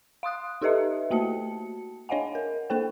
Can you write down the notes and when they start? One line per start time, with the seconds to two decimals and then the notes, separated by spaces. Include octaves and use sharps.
0.23 F5 C6 D#6 F#6
0.62 D#4 G4 A4 B4 D#5 E5
1.10 A3 A#3 F#4 A5 C#7
2.09 D4 C#5 D#5 F5 F#5 G#5
2.35 A#4
2.70 A#3 D4 A4 C5 G5